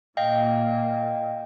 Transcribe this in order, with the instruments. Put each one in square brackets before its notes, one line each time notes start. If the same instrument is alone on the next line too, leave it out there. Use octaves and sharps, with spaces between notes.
[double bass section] A#2 [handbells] D#5 F5 G5